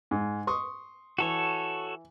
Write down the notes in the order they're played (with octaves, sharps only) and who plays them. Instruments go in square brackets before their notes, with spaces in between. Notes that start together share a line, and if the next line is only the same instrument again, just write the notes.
[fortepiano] G#2
C6 C#6 D#6
[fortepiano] E3 [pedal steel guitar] F#4 A4 C#5